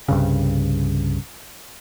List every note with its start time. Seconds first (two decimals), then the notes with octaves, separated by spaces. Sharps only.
0.09 C2 G2 C#3